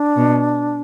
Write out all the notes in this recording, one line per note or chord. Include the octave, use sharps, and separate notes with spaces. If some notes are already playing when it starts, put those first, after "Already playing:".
Already playing: D4
B2